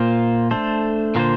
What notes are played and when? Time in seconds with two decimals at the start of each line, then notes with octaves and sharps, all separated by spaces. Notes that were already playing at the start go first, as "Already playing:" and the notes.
Already playing: A#2 A#3 F4 C5
0.51 A3 D4 A4 C5
1.15 A#2 D3 A#3 F4 C5